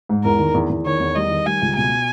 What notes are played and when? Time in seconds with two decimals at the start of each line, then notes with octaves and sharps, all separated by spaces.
0.09 G#2
0.24 E2 A#4
0.39 D#3
0.54 E2
0.70 E2
0.86 D#3 C#5
1.00 E2
1.16 G3 D#5
1.30 D#3
1.46 G3 G#5
1.62 C#2
1.77 B2 G#5